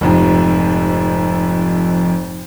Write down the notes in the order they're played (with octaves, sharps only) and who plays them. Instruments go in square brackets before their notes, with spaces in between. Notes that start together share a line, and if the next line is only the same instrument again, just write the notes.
[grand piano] F1 F2 G#2